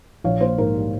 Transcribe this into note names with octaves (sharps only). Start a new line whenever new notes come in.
A#1 C#5 F5
A#3 C5
G#2 A#4
G3